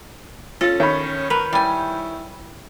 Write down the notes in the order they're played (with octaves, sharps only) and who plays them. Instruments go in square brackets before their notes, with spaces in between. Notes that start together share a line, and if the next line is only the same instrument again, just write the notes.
[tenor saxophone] C#4 [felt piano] F4 [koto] A4
[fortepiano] D#3 [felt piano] C#5 B5
[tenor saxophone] A#4 [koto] B4
[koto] G3 G#5 [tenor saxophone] E4